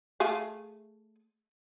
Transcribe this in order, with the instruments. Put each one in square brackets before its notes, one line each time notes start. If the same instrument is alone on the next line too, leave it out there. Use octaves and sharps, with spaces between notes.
[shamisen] A3 G#4 F5